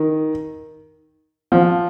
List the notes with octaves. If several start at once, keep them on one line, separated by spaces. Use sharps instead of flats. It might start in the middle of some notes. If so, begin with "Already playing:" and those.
Already playing: D#3
F3